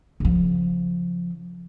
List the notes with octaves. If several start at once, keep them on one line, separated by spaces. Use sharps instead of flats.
C#3 F3